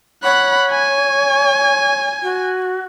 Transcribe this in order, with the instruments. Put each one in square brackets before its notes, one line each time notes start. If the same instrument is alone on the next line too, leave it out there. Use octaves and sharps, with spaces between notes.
[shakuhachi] C#5 [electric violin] F#5 B5
[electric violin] G#5
[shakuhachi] F#4